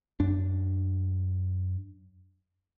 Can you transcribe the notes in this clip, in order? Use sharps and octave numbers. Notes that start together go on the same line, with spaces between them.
F#2 D4